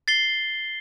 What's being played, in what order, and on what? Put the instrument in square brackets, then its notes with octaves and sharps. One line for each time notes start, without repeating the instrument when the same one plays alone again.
[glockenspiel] A6 C7 G7